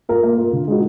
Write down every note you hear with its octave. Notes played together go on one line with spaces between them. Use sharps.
F4 A#4
A#3
F4 A#4
D3
G#3 D#4 F#4